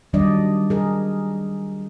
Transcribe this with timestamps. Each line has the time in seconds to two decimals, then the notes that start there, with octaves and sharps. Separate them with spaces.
0.13 D#3 F#3 G3 D4 D5 D#5
0.70 G#4 A#4 D#5